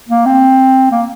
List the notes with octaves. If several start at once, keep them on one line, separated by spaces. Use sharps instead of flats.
A#3
C4
A#3